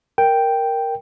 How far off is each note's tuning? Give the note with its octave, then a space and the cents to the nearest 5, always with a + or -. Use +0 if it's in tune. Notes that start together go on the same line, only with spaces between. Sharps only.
A#4 +0 G5 +0